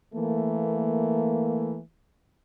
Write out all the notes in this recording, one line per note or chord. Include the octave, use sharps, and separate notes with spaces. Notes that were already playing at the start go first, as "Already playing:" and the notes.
E3 A3 A#3